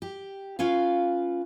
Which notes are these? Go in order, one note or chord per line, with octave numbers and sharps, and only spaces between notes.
G4
C#4 F4 B4 F5